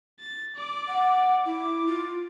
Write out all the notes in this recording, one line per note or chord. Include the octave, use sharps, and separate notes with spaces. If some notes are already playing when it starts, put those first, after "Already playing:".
A6
D5 D6
F#5
E4 D6
F4